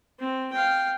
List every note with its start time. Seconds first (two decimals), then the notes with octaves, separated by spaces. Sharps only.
0.19 C4
0.52 F5 G5